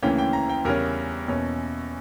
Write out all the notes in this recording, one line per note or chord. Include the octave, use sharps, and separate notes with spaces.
D2 C#3 E3 A#3 C#4 G5
G5
A#5
G5
E2 C#3 G3 C#4 A#4
E2 B2 A#3 C#4